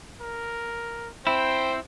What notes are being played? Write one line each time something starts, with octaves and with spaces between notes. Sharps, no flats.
A#4
C4 E4 C5 G5